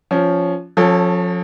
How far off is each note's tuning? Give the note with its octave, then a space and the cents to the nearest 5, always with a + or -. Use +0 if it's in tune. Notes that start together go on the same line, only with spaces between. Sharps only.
F3 +0 C#4 +10
F3 +35 C#4 -10 A4 +0